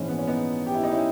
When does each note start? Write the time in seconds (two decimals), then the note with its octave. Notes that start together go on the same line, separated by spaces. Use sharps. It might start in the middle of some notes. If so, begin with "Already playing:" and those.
Already playing: A#1 G#2 E3 C#4
0.08 B3
0.18 C#4
0.27 B3 D#4
0.66 G4
0.74 E4
0.83 D#4
0.92 C#4 E4